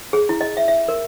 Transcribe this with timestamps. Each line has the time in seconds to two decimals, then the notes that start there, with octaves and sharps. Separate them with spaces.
0.13 G#4
0.29 E4
0.41 D#5
0.57 E5
0.68 E5
0.88 A#4